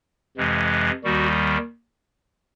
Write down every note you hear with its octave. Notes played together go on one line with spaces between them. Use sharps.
F2 C3 E3 G#3
D#2 D#3 G3 F#4